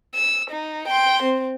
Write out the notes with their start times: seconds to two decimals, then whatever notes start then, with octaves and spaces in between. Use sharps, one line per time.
0.15 E6
0.51 D#4
0.88 G5 C6
1.23 C4